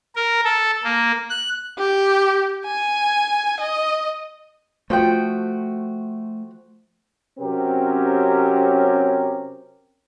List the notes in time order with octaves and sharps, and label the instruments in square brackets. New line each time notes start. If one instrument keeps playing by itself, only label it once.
[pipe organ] A#4
A4
A#3
F#6
[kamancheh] G4
G#5
D#5
[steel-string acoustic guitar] F3 F#4 G5 [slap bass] A3
[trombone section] C3 F#3 C4 C#4 G4 A#4